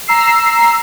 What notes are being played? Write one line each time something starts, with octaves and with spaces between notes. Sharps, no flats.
A#5 E6 C7